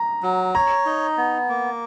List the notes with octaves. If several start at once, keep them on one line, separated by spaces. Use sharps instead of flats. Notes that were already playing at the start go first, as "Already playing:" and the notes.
Already playing: A#5
F#3
C#5 A#5
D#4
B3
A#3